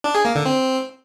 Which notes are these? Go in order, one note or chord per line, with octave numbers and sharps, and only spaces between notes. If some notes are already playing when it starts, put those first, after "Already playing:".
D4
G#4
A#3
D3
C4